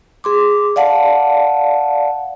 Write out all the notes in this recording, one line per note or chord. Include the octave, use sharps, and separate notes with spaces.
G#4 C6 D6
D5 F5 F#5 A5